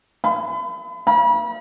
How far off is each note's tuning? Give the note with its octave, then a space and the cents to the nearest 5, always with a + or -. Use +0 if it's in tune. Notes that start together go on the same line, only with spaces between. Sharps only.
B5 +40
B5 -40